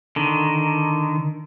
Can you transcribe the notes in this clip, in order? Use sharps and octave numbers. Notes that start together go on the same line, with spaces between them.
D3 D#3